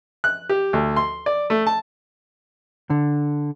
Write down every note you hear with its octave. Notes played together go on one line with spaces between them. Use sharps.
F#6
G4
D2
C6
D5
A3
A5
D3